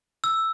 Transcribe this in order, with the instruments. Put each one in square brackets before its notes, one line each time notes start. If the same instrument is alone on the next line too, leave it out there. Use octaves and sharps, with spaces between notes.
[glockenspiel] E6